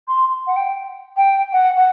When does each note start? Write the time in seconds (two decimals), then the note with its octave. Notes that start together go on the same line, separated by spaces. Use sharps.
0.08 C6
0.47 F#5
0.56 G5
1.16 G5
1.53 F#5
1.77 F#5